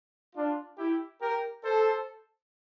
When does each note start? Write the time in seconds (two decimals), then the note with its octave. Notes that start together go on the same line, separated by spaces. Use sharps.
0.36 D4 F4
0.78 E4 G4
1.20 G4 A#4
1.63 A4 C5